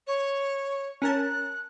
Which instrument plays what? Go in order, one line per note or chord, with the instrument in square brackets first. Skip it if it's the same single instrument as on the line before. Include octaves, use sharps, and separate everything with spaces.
[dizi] C#5
[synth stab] C#4 A#4 A5 [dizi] F#6